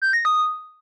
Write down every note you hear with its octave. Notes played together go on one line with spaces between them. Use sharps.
G6
A#6
D#6